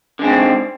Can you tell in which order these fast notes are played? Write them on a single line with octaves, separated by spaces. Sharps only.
D3 G#3 C4 G#2